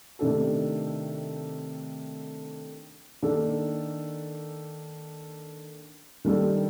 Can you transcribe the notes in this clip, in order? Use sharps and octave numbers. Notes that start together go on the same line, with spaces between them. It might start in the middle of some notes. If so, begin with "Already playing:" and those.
C3 D#3 A3 D4 A4
D#3 A#3 D4 A4
D#3 G3 D4 A4